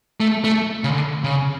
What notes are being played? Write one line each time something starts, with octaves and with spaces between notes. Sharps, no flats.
A3
A3
C#3
D3
C#3